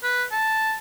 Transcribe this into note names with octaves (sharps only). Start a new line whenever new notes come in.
B4
A5